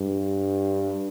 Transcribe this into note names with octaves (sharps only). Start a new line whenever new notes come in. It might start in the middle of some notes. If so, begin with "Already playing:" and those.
Already playing: G2